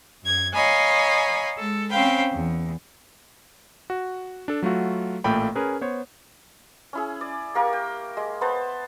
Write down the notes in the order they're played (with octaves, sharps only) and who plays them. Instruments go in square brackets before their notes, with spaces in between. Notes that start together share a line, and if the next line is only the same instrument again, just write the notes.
[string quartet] F#2 G#6
C#5 D#5 F5 G#5 A#5 B5
G#3 A4
C4 C#4 C5 F5 G5 B5
E2
[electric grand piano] F#4
D4 A4
F#3 A3 F4 F#4
A1 A#2 A3 A#3 G5 B5
C#4 G#4 A#4 B4
B3 C5 C#5
[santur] C#4 E4 G#4
D5
A#3 G4 A#4 C#6
G5
G#3
B3 B4 C5 A5